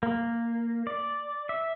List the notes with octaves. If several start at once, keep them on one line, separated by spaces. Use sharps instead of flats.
A#3
D5
E5